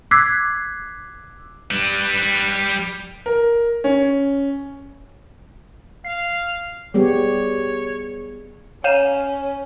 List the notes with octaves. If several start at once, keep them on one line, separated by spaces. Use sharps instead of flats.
D6 E6 F#6 G#6 B6 C7
G3 B4
A#4
C#4
F5 C7
G3 B3 G4 G#4 C#5
C#4 C#5 F5 A#5 D#7 E7